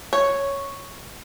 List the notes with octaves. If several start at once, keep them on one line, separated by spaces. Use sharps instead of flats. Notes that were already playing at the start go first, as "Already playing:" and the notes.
C#5